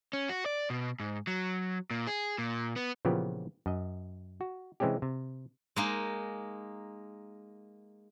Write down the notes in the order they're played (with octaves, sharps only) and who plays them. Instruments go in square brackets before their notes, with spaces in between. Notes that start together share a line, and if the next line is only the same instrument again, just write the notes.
[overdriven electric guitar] C#4
F#4
D5
B2
G#2
F#3
A#2
G#4
A#2
B3
[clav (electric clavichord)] A#2 C#3 E3 F3 B3 G4
F#2 D#5
F#4
C3 E3 G#3 C4 C#4 G4
C3
[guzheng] G#3 A#3 D#4